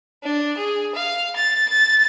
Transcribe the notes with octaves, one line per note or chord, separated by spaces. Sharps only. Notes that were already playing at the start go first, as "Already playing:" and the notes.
D4
G#4
F5
A6
A6